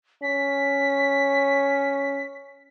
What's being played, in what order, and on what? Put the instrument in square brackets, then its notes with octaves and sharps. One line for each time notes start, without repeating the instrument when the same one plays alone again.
[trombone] C#4 [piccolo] B6